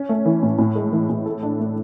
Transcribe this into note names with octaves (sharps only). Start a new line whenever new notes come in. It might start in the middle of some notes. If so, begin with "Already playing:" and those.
Already playing: C#4
A3
E3
A2
A2
G#3
E3
A2
A4
D4
A3